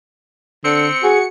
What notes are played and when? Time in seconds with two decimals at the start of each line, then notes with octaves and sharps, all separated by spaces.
0.64 D3 C4 C#7
1.03 F#4 G#4